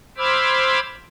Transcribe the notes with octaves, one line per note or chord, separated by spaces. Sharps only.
C5 B5 D6 E6 F6 G#6